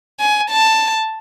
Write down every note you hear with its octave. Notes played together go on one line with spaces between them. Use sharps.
G#5
A5